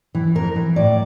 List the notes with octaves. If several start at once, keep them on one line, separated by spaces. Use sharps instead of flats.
E3
F2 A#4
E3
A2 D5